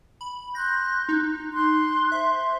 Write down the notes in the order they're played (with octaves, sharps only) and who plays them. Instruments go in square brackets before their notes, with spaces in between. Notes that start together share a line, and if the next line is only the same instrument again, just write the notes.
[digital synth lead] B5
[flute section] C6 F#6 G6 [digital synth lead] A#6
[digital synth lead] D#4
[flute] C6 [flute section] F#6
[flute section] C5 [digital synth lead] E5 [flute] C6